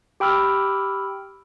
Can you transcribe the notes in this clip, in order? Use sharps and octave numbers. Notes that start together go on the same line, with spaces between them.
G4 G5 B5 E6 F6